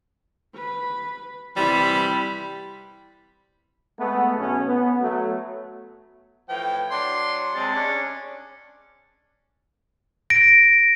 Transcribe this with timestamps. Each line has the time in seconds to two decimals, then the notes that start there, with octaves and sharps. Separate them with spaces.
0.55 B4
1.56 C3 E3 G3 E4 B5
4.00 G#3 A3 B3
4.38 B1 B2 B3 C#4
4.67 B3
5.01 F#3 A3
6.49 A2 E3 F3 G5
6.91 F#3 D4 C6
7.55 C3 G#3 A5
7.74 C#4 D4
10.30 A#6 D7